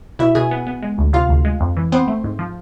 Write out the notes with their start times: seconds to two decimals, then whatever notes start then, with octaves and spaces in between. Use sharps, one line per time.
0.19 B2 E4 E5
0.35 B2 G#4 G#5
0.51 B3
0.67 B3
0.82 G#3
0.98 D2
1.13 C3 F4 F5
1.29 D2
1.45 G#3
1.61 F2
1.77 E3
1.92 B3 C4 C5
2.08 A3
2.24 G#2
2.39 F3